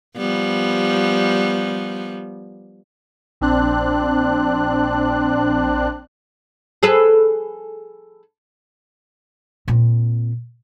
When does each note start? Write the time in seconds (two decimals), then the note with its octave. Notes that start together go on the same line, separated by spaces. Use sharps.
0.16 F3 G3 B3
3.41 A#1 C4 D4 F#6
6.83 G#4 A4 B4
9.68 A#2 C4